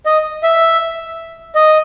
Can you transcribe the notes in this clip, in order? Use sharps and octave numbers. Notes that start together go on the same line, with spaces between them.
D#5
E5
D#5